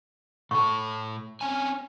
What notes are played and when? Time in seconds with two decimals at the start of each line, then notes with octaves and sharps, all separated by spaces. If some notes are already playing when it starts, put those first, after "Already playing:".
0.51 A2 A4 C#6
1.41 C4 C#4 G#5